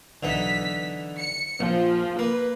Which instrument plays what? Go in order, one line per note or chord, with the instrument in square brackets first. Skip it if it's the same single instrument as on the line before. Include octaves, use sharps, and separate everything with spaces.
[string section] B1 B6 [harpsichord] D3 E3 D#4
[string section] C#7
[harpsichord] A#1 [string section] F3
[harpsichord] A#3 [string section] B4